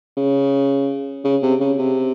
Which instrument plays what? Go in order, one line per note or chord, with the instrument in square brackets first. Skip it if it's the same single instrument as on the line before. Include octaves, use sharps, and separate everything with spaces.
[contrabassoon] C#3
C#3
C3
C#3
C3